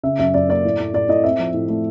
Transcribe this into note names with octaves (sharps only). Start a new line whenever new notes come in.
C#3 E5
F#2 E5
F#2 D5
A#3 D5
A2
A2
A2 D5
A2 D#5
C4 E5
F3
A2
A3